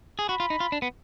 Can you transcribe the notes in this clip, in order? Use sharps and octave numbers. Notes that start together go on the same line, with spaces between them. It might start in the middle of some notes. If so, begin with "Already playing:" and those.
G#4
F#4 B5
F4
D#4
F4
D4
B3